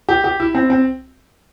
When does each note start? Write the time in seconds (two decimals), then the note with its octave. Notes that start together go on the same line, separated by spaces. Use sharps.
0.09 G4
0.24 G4
0.40 E4
0.55 C4
0.70 C4